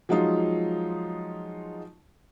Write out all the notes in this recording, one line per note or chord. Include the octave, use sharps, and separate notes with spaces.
F3 F#3 G#3 D#4 F4